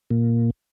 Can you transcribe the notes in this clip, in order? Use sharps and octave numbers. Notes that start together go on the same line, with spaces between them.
A#2